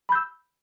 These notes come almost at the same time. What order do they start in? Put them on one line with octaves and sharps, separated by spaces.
B5 G6 E6